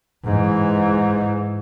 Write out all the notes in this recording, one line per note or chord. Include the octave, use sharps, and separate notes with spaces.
G#2 E3